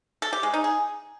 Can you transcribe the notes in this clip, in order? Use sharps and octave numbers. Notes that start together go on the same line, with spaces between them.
A4
G4
G#3
D#4
G#4